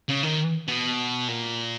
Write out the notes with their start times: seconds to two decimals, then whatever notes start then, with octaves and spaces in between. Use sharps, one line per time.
0.09 C#3
0.23 D#3
0.68 B2
1.28 A#2